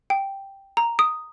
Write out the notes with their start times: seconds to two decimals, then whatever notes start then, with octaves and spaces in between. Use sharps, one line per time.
0.10 G5
0.77 A#5
0.99 D#6